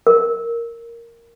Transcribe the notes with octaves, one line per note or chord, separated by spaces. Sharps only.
A#4